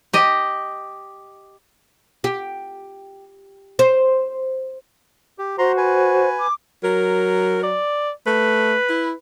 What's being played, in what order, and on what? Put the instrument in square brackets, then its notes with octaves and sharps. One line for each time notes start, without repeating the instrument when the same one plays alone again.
[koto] G4 D#5
[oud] G4
C5
[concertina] G4
[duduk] F#4 [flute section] C5 [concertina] A#5 C6
[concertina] B4 G#5
[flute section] D6
[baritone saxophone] F#3 [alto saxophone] A#4
[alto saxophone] D5
[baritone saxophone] A3 [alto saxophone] B4
[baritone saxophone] E4